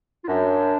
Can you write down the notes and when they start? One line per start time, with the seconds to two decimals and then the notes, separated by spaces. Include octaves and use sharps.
0.24 F4
0.28 F#2 D4